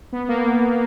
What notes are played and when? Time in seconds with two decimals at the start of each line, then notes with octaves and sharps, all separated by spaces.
0.12 B3
0.29 A#3